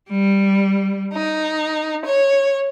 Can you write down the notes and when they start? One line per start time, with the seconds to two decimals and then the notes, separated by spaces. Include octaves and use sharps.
0.10 G3
1.13 D#4
2.04 C#5